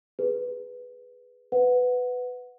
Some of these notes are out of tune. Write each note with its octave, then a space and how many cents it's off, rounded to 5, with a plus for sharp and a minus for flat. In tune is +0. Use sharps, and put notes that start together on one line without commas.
G#4 +0 B4 +0
B4 +15 F#5 -15